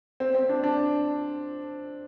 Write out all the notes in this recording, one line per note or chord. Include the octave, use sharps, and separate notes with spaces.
C4
C4
D4
D4